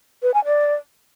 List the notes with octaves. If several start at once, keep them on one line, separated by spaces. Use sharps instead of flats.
B4
G#5
D5